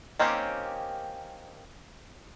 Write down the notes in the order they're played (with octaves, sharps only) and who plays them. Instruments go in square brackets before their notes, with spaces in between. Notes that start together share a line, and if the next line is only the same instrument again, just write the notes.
[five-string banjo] D#3 A#3 C4 C#4 G4